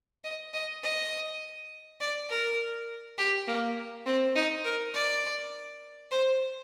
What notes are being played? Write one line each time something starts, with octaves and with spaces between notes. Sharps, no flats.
D#5
D#5
D#5
D5
A#4
G4
A#3
C4
D#4
A#4
D5
C5